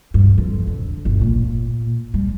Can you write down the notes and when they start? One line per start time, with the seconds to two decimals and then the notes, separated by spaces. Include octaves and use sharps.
0.14 G2
0.38 F2
0.67 D3
1.05 G1
1.21 A#2
2.14 G3